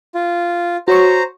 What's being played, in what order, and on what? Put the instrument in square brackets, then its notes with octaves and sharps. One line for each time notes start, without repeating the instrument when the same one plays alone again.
[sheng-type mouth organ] F4
[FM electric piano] F#4 C#5 C#6 [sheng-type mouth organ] C5 A#5